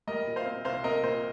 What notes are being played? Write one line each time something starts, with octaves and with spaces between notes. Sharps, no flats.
G3 A#4 D#5
A#2
C5 F5
C4
C2 C5 F5
C4 A#4 D#5
A#2 C5